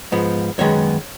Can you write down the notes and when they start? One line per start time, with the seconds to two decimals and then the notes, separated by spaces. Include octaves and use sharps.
0.12 G#2 F3 B3
0.58 F#2 D#3 G#3 B3 C#5